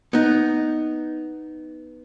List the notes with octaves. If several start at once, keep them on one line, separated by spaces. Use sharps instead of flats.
B3 D#4